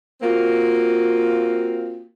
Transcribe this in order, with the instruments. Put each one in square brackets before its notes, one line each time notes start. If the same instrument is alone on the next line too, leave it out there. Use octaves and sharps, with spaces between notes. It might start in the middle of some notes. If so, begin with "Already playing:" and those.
[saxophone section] A#3 C4 F4 F#4